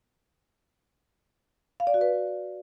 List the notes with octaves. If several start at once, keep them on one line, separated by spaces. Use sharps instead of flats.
F5
D5
F#4
B4